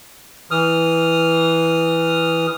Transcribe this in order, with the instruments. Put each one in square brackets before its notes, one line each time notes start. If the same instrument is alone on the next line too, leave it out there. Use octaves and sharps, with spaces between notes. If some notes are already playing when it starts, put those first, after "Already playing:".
[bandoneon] E3 D#6 F6